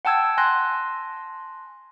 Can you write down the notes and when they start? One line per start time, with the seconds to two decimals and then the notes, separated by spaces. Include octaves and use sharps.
0.05 F#5 G5 A5 E6 G#6
0.38 G#5 A5 C6 F#6 A#6